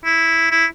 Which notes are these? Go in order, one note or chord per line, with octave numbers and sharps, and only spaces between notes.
E4
E4